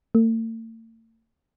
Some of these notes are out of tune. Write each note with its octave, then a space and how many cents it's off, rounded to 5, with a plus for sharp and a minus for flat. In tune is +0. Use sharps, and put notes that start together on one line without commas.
A3 +45